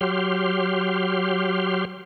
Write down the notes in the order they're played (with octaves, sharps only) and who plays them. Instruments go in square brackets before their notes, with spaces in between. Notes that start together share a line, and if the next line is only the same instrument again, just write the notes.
[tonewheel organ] F#3 G4 C6 F6